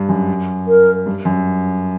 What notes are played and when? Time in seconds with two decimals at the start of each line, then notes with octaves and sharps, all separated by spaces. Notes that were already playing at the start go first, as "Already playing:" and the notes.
Already playing: G2
0.09 F#2
0.68 A#4
1.06 G2
1.25 F#2